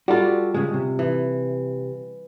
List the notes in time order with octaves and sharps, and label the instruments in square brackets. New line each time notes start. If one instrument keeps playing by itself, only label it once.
[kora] G3 F4 [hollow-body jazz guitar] F#4 A4
[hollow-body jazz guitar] C#3 G#3
C3
[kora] E3